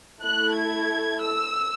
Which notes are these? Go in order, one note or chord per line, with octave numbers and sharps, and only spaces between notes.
A3 E4 A4 F#6
G#6
E6